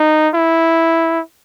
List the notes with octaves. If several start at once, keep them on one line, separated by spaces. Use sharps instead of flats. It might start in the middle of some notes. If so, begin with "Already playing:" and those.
Already playing: D#4
E4